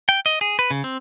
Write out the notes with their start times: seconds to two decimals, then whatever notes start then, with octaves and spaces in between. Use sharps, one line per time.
0.09 G5
0.26 D#5
0.41 G#4
0.59 B4
0.71 C#3
0.84 C4